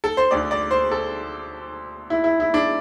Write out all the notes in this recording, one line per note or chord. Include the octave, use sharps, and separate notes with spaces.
A4
C5
D2 D3 D5
D5
C5
A4
E4
E4
E4
D4